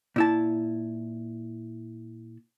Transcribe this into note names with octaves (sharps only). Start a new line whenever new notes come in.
A#2 E4 A5